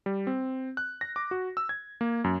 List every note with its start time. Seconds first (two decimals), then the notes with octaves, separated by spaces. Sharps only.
0.06 G3
0.27 C4
0.77 F#6
1.01 A#6
1.16 D6
1.31 F#4
1.57 E6
1.69 G#6
2.01 A#3
2.24 F#2